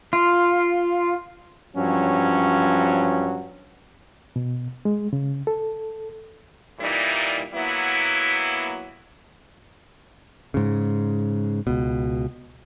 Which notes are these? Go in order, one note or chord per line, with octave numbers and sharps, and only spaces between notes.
F4
G2 F3 F#3 C#4
B2
G#3
C#3
A4
A#2 E3 G3 D#4 E4
F#3 A#3 B3 E4
G#2 C#3
C#2 B2